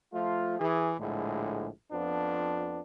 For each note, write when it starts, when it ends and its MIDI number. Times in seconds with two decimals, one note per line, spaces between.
0.13 0.58 53
0.13 0.58 57
0.13 0.58 65
0.59 0.93 52
0.59 0.93 68
0.99 1.67 34
0.99 1.67 45
0.99 1.67 50
0.99 1.67 56
1.91 2.79 41
1.91 2.79 53
1.91 2.79 59
1.91 2.79 62